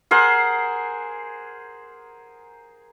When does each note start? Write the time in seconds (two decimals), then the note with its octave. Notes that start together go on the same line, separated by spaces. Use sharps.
0.11 G#4 A#4 C5 F#5